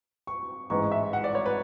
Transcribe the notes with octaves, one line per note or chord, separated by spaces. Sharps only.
C#6
A1 G#2 E3 G#3 C#6
E5
F#5
D5
C#5
B4